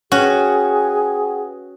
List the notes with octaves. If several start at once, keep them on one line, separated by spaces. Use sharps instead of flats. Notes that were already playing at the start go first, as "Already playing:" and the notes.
C#4 F#4 G#4 B4 F#5 G5